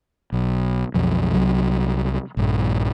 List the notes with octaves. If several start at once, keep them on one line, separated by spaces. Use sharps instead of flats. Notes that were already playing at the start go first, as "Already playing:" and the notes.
B1
B1 F2
C2 F#3
A#1 G2